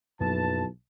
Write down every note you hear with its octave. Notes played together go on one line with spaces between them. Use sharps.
B1 F#2 E3 F3 A#3 A5